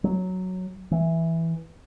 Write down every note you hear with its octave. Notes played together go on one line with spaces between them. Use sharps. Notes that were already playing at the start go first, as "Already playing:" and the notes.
F#3
E3